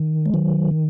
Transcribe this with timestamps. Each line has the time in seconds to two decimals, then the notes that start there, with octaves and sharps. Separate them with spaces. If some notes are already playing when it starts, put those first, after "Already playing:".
Already playing: D#3
0.26 G#3
0.34 D#3 F#3